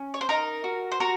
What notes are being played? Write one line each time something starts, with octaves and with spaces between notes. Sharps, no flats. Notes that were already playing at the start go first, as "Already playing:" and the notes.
Already playing: C#4
C#5
C5
D#4 A#4
F#4
C5
F#4 A#4